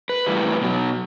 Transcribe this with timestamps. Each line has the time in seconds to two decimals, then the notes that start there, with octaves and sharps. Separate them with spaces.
0.09 B4
0.26 A2 E3 G3
0.62 B2 F#3